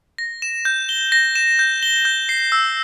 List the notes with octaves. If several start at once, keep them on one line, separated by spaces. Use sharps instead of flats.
A#6
E7
G6
G7
A#6
E7
G6
G7
G6
C7
E6